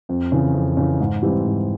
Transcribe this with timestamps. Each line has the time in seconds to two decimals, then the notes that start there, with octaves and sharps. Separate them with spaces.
0.09 F2
0.32 C#3 E3
0.54 F2
0.77 C#3 E3
1.00 G#2
1.23 E3 G3 C4
1.45 G#2